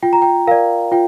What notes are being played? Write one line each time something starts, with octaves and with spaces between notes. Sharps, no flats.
F4 G5
A#5
G5
A#4 D5 F5
F4 G5